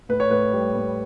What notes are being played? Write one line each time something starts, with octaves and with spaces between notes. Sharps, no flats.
A2 B4
C#5
A2 B4
G3
A2